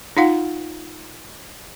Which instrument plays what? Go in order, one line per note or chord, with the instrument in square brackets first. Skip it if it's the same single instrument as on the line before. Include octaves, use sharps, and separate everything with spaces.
[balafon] D#4 F4 F5 F#5